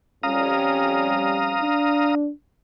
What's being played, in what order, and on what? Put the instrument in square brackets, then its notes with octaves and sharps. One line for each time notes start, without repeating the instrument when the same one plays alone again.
[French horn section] F2 G3 C#4 [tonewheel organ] F5 A#5 D#6
[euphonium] D4